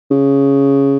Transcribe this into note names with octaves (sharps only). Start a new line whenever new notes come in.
C#3